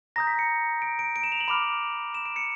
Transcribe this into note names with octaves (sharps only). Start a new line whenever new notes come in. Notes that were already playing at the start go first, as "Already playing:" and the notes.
A#5 D#6 G6 A#6
B6
C#7
D7
D7
D7
E7
F7
F#7
B5 D6 F6 F7
E7
D7
C#7